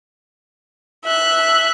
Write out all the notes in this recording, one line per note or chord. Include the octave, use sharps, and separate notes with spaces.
E5 F#6